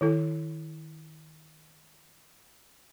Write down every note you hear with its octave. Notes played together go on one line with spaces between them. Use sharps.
D#3 E4 A4